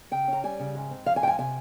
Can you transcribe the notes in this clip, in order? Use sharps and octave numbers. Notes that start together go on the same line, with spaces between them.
C#3 G5
C#4
A#5
G3 G#5
C#3
G#2
C4
F3 F5
G#5
G#2 G5
G#5
C3 G#5